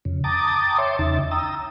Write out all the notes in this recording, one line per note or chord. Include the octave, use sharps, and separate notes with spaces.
F2 C#3
G5 A5 A#5 D6 D#6 A6
C#5 E5 G5 C6 D6
E2 C#3 D#4 E5 A6
G5 A#5 D#6 E6